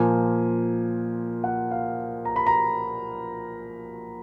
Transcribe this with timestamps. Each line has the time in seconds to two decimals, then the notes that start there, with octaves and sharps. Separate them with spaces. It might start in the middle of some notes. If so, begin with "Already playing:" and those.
Already playing: A#2 F3 A#3 G#5
1.44 F#5
1.71 F5
2.25 A#5
2.36 B5
2.47 A#5